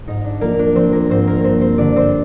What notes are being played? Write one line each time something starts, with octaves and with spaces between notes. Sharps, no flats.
G#2 D#4
D4
F3 A#3 A#4
D4 D5
F3 C4 C5
A#3 A#4
G#2 C4 C5
A#3 A#4
G2 C4 C5
C4 C5
D3 D4 D5
C4 C5